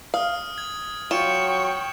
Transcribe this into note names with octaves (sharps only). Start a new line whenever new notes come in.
F5 D#6 F6
G#6
F#3 F4 G5 C#6 E7